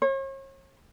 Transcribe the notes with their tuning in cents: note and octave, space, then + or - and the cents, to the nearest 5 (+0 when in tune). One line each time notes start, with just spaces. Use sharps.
C#5 -40